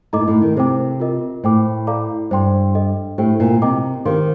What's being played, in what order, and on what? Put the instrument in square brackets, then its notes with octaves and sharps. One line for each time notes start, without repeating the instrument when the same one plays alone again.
[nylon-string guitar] A2 [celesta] D#4 A4 D#5 A#5 D6
[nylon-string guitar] A#2
A2
D#3
[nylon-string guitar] C3 [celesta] A4 C5 G5 D6
[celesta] F4 A#4 D#5
[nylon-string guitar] A2 [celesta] C5 G5 D6
[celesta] A4 D5 F5 A#5 D6
[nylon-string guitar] G2 [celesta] C5 G5 C6
[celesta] A4 D#5 G5
[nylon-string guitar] A2 [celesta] G4 C5 G5
[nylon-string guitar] A#2
[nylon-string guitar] C3 [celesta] A#4 D#5 G5 A#5 D6
[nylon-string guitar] D#3 [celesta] G4 C5 F5 C6